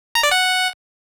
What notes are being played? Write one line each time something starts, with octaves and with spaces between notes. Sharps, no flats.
A#5
D5
F#5